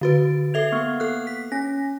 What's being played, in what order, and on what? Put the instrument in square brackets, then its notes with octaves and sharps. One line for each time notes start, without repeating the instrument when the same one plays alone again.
[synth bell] D3 F#4 B4
[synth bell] A4 E5 F7 [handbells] G#6
[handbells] A#3 B3 C#6
[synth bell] A4 F#6
B6
[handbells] C#4 [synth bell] A#6